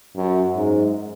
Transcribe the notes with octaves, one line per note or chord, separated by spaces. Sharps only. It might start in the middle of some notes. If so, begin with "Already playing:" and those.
F#2
G#2